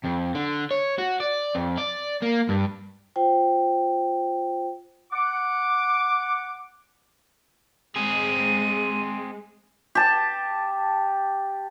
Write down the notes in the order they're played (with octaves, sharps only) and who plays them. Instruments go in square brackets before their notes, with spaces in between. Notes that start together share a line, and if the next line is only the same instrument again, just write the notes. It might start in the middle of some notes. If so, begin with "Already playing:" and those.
[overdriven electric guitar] F2
D3
C#5
F#4
D5
F2
D5
A#3
G2
[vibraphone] F4 C5 G5
[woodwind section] F#5 D6
[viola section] G#3 [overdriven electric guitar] C4 G#4 [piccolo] D#7
[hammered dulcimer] G4 A5